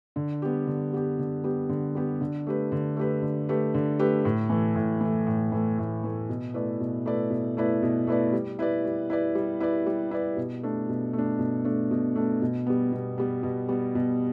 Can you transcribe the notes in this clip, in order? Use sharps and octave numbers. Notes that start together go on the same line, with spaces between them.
D3
G3 B3 G4
D3
G3 B3 G4
D3
G3 B3 G4
D3
G3 B3 G4
D3
A3 G4 B4
D3
A3 G4 B4
D3
A3 G4 B4
D3
A3 G4 B4
A2
E3 A3
A2
E3 A3
A2
E3 A3
A2
E3 A3
B2
A3 E4 B4 D5
B2
A3 E4 B4 D5
B2
A3 E4 B4 D5
B2
A3 E4 B4 D5
G3
E4 B4 D5
G3
E4 B4 D5
G3
E4 B4 D5
G3
E4 B4 D5
B2
A3 D4
B2
A3
D4
B2
A3 D4
B2
A3 D4
B2
G3 B3
B2
G3 B3
B2
G3 B3
B2